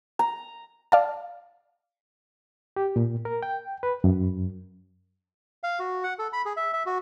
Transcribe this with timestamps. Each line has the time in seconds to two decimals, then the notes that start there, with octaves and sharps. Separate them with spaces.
0.19 A#5
0.92 D5 F5 A5
2.76 G4
2.96 A#2
3.25 A#4
3.43 G5
3.83 B4
4.04 F#2
5.64 F5
5.79 F#4
6.04 F#5
6.19 A4
6.33 B5
6.45 G#4
6.57 E5
6.73 E5
6.86 F#4